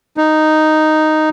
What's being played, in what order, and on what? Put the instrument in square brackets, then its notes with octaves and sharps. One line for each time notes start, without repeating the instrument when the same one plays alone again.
[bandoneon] D#4